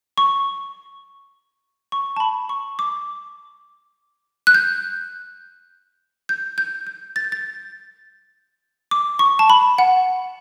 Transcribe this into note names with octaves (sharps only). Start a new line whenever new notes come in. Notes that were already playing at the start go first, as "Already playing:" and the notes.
C#6
C#6
A5
B5
C#6
D6
F#6
G6
G6
G6
G6
A6
G6
A6
D6
C#6
A5
B5
F#5